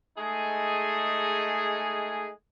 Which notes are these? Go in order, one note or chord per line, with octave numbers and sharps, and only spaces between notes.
G#3 A3 D#4 G#4